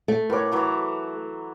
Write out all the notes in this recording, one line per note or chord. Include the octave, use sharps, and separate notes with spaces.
A3
A2 A#4 B4 C#5 D6
E3 F#3 A#5